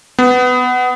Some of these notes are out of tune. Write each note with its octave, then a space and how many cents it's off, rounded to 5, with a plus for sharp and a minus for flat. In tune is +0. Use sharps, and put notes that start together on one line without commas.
B3 +15